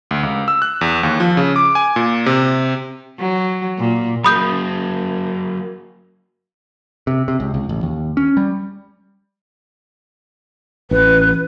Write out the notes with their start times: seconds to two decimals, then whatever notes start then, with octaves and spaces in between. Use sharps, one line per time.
0.11 D2
0.23 C#2
0.48 E6
0.62 F#6
0.81 E2
1.03 D#2
1.20 F3
1.37 C#3
1.56 D6
1.75 G#5
1.96 A#2
2.26 C3
3.19 F#3
3.78 A#2
4.24 F#3 A#3 B5 D#6 G6
7.07 C3
7.28 C3
7.40 C#2
7.54 C#2
7.69 A1
7.83 D#2
8.17 C#4
8.37 G3
10.91 A1 B4